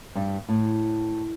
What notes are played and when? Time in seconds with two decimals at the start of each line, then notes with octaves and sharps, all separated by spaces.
0.15 G2 G3
0.49 A2